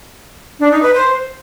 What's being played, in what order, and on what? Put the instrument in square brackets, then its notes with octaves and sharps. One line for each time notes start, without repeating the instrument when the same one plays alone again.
[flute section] D4
D#4
B4
C5